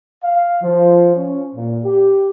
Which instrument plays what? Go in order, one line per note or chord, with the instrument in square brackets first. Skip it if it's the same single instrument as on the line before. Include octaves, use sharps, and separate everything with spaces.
[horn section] F5
F3
C#4
A#2
G4